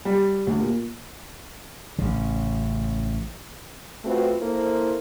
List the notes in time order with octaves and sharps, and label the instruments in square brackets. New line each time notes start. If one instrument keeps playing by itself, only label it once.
[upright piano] G3
D2
A#2
[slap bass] A1 C#3
[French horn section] A3 C4 F4 F#4 B4
A#3 E4 A4 C5